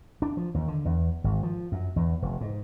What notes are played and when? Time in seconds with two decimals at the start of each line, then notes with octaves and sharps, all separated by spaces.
0.22 D4
0.37 F3
0.55 D#2
0.68 D3
0.85 E2
1.24 G#1
1.43 F3
1.72 F#2
1.96 E2
2.22 F1
2.41 G#2